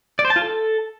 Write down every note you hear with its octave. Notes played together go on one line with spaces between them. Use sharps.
D5
C5
A5
F4
A4